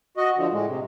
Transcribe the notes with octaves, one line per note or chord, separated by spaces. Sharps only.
F#4 D#5
D3 F3
A2 G#3
C3